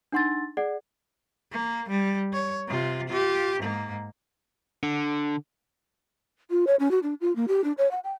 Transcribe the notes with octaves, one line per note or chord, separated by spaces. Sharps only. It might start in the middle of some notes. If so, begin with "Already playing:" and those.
D4 D#4 F#5 C6 E6 A6
G#4 D5 F#5
A#3
G3
C#5
C3 F4
F4 G4
G#2 A#3
D3
F4
C#5
C#4
F#4
D4
F4
A#3
G4
D4
C#5
F#5
G5